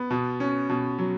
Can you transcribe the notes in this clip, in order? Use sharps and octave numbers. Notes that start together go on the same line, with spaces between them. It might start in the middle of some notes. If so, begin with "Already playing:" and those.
Already playing: B3
B2
C#4
B2
F#3